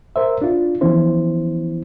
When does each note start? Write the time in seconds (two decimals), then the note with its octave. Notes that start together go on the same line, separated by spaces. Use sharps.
0.16 A#4 C5 E5
0.42 D4 F4
0.81 E3 F3 B3 C#4 E4 C5